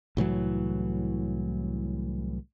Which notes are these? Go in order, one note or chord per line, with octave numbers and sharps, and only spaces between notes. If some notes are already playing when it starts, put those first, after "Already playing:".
C2 A2 E3 F#3